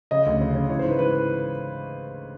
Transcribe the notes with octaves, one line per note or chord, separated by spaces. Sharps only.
C#3 D#5
D2
C#3
C#3
E3 C#5
C5
G#2 B4
E3 B4